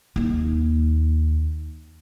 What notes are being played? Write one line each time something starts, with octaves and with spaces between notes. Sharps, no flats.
D#2 D#4